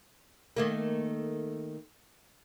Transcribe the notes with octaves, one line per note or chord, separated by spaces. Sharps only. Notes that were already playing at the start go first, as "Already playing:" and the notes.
D#3 A3 A#3